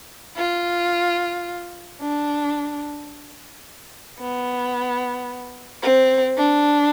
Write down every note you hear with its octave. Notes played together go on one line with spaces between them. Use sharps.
F4
D4
B3
C4
D4